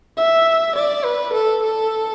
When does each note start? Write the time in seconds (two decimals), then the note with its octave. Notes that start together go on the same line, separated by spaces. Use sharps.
0.17 E5
0.75 D5
1.04 B4
1.33 A4
1.63 A4